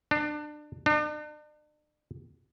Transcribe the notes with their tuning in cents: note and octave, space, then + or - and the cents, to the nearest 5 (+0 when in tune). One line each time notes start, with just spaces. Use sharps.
D4 +30
D4 +45